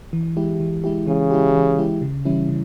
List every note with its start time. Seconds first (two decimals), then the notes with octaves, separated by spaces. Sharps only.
0.13 E3
0.37 G#3 E4 G4
0.60 E3
0.84 G#3 E4 G4
1.07 C#3 E3
1.31 G#3 E4 G4
1.55 E3
1.78 G#3 E4 G4
2.02 C#3
2.25 E3 G3 C#4 E4
2.49 C#3